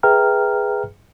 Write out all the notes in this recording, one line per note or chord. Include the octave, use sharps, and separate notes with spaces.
G#4 B4 E5 G5 A#5 F6